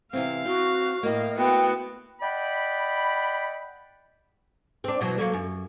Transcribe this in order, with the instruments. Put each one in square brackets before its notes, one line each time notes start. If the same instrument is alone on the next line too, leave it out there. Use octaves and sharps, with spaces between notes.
[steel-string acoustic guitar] C3 E3 C4 [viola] F5
[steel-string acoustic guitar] C4 [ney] F#4
[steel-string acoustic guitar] A2 A#3 [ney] D#5
[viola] B3 F#4 [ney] G5
[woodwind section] D5 D#5 F#5 G5 B5
[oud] C4 D4
B2 E3 F#3
F#3 A3 A#3
F#2